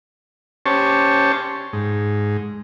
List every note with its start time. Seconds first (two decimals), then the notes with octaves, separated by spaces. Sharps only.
0.66 C#4 G4 C5 C#5 A5
1.73 G#2